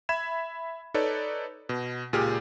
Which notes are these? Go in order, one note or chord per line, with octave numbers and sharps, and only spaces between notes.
E5 B5 G#6 E7
D#4 A4 B4 C#5 D5
B2
C#2 A#2 G4 G#4 F6